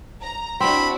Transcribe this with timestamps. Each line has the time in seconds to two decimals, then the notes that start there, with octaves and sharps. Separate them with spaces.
0.21 A#5
0.60 C4 D4 E4 F#4 B5